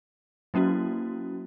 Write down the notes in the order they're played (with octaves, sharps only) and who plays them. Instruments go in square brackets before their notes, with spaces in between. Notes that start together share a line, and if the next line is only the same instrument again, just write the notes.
[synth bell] F#3 A#3 C#4 E4 F#4